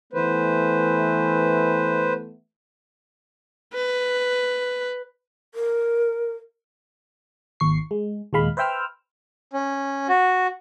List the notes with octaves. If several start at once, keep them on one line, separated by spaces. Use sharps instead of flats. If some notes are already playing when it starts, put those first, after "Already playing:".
E3 A3 B3 B4 C5
B4
A#4
G#1 D#2 C#6 C7
G#3
D#2 A#2 G#3 F5 B5
B4 C5 E5 G5 E6 F6
C#4
F#4